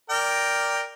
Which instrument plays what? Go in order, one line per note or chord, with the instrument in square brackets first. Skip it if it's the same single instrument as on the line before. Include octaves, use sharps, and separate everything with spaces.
[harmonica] A#4 D5 G5